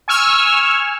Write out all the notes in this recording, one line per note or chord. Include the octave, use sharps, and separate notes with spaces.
G#5 C#6 E6 F6